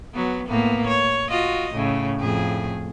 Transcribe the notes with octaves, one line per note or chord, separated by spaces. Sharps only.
F#3 B3
A2 A#3 B3
C#5
F4 F#4 D#5
A2 C#3
F2 A2 G#4